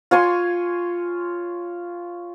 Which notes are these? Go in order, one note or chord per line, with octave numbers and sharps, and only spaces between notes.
F4 C#5 G#5 C6